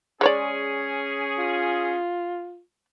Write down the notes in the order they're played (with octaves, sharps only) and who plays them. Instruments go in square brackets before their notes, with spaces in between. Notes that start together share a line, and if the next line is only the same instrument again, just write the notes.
[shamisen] G#3 C#5 D5 [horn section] C#4 G#4
[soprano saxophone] F4